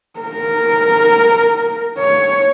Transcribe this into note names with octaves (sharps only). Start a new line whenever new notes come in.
A#4
C#5